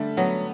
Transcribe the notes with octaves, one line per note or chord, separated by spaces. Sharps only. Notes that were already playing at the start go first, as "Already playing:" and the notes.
Already playing: D3 G3 A3
F#3 B3